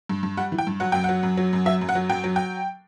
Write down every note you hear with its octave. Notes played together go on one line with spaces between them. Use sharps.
G2
G2
G3 F#5
E3
G5
G2
F#3 F#5
F#2 G5
F#3 F#5
F#2
F#3
F#2
F#3 E5
F#2
F#5
F#3
F#2 G5
F#3
G5